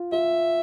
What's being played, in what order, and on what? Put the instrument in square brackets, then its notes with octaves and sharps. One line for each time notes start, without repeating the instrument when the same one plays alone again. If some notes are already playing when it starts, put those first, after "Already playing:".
Already playing: [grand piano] F4
[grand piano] F4 [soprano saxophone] E5